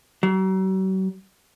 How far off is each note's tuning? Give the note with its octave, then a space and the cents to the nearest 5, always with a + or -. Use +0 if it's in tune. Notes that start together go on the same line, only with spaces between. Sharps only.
F#3 +40